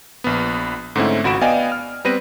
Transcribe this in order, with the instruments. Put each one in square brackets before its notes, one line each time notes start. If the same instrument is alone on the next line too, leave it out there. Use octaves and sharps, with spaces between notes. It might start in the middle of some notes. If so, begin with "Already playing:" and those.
[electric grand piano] A#1 B3
G#2 D3 A3 C4 C#4 E4
G#1 C#2 F#4 B5 D7 E7
B3 D5 D#5 F5 G5 G#5
F6
G3 B3 C4 B4 A#6 D#7